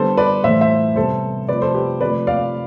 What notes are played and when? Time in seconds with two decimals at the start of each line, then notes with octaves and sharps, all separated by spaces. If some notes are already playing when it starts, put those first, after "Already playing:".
Already playing: D3 G3 B3 A4 C5
0.17 B4 D5
0.44 A2 E3 A3 C5 E5
0.61 C5 E5
0.96 C3 G3 B3 A4 C5
1.49 C3 F3 A3 B4 D5
1.62 A4 C5
1.74 G4 B4
2.01 C3 F3 A3 B4 D5
2.27 D5 F5